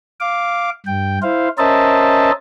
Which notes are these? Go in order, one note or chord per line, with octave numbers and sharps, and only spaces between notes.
F5 D6
G2 G5
E4 C5 F5
C#4 A#4 C5 D#5 E5 A5